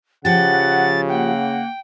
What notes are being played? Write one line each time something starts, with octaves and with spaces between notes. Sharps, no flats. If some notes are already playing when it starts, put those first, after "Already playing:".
C#3 F3 G4 F#5 A6
A#3 F#5 G5